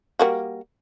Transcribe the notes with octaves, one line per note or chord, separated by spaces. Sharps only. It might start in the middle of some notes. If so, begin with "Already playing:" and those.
G3 A#3 F#4